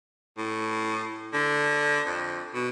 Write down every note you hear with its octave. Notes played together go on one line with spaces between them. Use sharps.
A2
D3
F2
B2